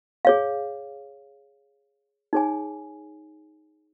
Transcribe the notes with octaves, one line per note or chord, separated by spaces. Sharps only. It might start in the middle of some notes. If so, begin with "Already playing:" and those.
G#4 C#5 F5
D#4 G#4 C#5 G#5